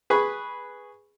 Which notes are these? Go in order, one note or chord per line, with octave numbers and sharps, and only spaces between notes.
G#4 B4 B5 C#6